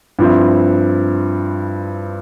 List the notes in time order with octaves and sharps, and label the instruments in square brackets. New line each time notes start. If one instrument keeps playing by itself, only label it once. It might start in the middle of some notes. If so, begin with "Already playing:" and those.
[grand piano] G2 F3 C4 E4